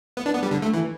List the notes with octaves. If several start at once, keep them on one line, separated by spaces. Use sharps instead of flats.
B3
D4
B3
G3
D3
A3
E3